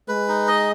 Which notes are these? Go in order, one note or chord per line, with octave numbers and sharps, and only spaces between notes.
G#3 B4
D#4
D#5